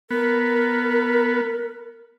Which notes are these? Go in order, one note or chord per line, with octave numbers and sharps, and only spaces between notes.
B3 A#4